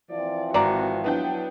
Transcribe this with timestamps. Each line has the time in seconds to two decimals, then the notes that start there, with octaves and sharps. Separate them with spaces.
0.11 E3 F3 C4 D5
0.54 G#1 F#4 D5 A#5
1.04 F#3 B3 D4 E4 G5